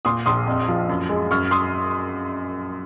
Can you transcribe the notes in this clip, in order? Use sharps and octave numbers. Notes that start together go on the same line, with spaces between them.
A#2 C6 D#6
A#1 C6 D#6
F2
F3
F#2
G#3
F#2 C#6 F6
C6 D#6